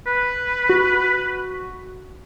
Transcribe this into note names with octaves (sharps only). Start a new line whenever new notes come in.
B4
F#4